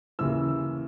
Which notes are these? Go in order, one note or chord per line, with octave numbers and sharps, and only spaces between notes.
D#2 C#3 E3 E6